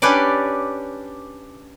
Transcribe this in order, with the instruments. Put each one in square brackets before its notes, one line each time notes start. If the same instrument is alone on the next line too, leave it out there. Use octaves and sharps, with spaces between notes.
[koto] C#4 D4 G4 B4 C#5 D5